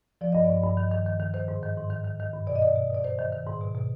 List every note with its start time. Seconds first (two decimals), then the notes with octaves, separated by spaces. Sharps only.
0.21 F3 D5
0.32 G2 D#5
0.44 D5
0.50 G2
0.63 G2
0.77 D#3
0.92 D#3
1.06 D#3
1.20 D#3
1.34 D#3 C5
1.48 G#2
1.63 D#3
1.77 G#2
1.90 D#3
2.04 D#3
2.20 D#3
2.34 G2
2.47 B2 D5
2.56 D#5
2.61 B2 D5
2.76 B2
2.90 B2 D5
3.04 D#3 C5
3.19 D#3
3.32 D#3
3.47 G#2
3.61 B2
3.75 B2